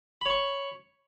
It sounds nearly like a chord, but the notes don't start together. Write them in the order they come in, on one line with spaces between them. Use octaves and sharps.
B5 C#5 C#6